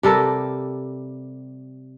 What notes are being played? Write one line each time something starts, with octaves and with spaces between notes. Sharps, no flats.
C3 G3 A4 A#4